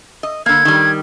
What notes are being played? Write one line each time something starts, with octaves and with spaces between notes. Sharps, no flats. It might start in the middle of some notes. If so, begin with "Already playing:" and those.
D#5
D3 A#3 G#6
D#3 G3